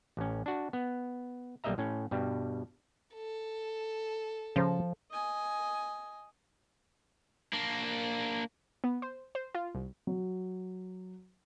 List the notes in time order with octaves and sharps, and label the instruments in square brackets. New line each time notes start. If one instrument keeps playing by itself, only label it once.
[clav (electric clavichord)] A1 C#4
D4 F#4
B3
B1 G3 A#3 D#5 E5 A#5
A2 C#4
G2 B2 G3
[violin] A4
[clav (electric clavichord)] C#3 C5 A#5 [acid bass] F3
[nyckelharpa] D#5 G#5
[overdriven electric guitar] A#3 D4
[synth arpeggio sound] B3
C5
C5
F4
C2
[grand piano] F#3